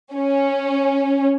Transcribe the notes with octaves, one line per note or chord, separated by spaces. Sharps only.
C#4